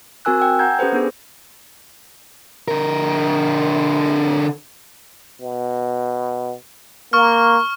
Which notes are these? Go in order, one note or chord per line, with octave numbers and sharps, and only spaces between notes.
C4 F#4 A#4 G#5 E6 F#6
G5 G#5 E6
F#5 A#5 G6 G#6
C#4 G4 A4 B4 C5
B3 D4 G#4
D3 A#4
B2
A#3 C#6 F6